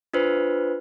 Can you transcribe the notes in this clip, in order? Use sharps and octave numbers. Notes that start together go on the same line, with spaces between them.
D4 F4 B4 C5